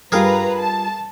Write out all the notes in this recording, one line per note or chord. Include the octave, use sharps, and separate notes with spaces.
G2 G3 F4 G#4 A#4 B4 F5 A#5
A5